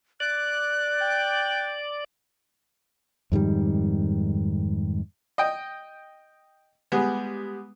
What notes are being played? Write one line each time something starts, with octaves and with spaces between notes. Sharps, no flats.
D5 F#6
G5
F2 G#2 D#3 G3
D#5 G5
G3 G#3 B3